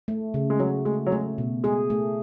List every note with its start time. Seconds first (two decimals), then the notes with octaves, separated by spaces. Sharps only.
0.08 A3
0.34 C#3
0.50 G#3
0.59 F#3 F#4
0.85 G#3 A3
1.07 F#3
1.11 G#3 A3
1.38 B2
1.64 G#3 G#4
1.90 A3